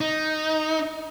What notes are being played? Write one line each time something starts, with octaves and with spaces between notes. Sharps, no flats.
D#4